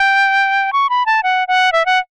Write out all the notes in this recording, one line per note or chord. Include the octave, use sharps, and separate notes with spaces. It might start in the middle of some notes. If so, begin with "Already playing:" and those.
Already playing: G5
C#6
B5
A5
F#5
F#5
E5
F#5